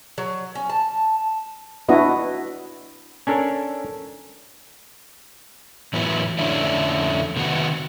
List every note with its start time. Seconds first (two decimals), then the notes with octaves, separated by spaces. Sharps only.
0.18 F#3
0.55 C#4
0.70 A5
1.89 B3 D4 E4 F#4 D#5
3.27 C#4 D4 A4 A#4
5.93 A2 E3 F#3 B3 B4
6.39 F2 D3 A3 C#4 D4 E4
7.36 C3 D#3 B3 F#4